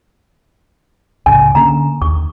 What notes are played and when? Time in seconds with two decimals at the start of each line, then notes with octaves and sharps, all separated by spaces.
1.26 C#2 A2 C#3 G#5
1.55 D3 A#3 C#4 A#5
2.02 D#2 C#6